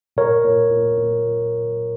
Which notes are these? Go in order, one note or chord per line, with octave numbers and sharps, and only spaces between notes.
A#2 A#4 C#5
A#2
A#2
A#2